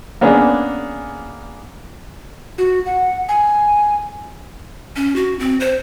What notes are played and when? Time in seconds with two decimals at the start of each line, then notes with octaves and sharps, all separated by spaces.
0.21 A#3 B3 C#4 D4 G#4
2.58 F#4
2.86 F#5
3.29 G#5
4.96 C#4
5.16 F#4
5.39 C4
5.60 C5